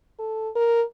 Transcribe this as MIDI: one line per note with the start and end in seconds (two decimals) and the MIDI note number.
0.19 0.50 69
0.56 0.83 70